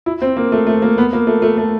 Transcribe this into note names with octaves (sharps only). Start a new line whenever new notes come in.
E4
C4
A#3
A3
A3
A#3
B3
A#3
A3
A3
A3